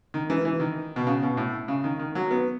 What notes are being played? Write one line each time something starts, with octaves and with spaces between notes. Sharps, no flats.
D#3
E3
E3
D#3
B2
C#3
B2
A2
C#3
D#3
D#3
F#3
B3